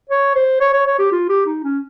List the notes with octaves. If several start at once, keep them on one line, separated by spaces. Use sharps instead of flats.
C#5
C5
C#5
C#5
C#5
G4
F4
G4
D#4
C#4